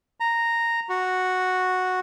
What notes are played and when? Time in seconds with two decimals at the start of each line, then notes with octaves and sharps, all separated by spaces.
0.20 A#5
0.89 F#4